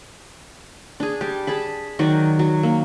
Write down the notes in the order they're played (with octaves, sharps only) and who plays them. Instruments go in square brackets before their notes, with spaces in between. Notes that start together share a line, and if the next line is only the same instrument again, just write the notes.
[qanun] D4 G#4
G3 G4
G#4 A5 B5
D#3 F#3 F#4 D5
F#3
A#3